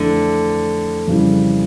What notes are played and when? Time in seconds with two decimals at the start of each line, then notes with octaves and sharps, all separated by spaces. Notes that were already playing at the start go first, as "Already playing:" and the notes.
Already playing: F2 D3 E3 A3
1.07 F2 C#3 E3 G3